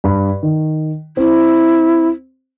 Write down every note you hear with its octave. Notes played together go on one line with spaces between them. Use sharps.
G2 B5
D#3
C4 E4